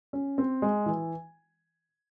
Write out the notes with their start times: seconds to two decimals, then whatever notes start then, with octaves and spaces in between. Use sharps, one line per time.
0.13 C#4
0.38 C4
0.62 G#3
0.86 E3